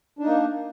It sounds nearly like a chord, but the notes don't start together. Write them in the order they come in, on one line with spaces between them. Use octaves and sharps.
D4 D#4 A#3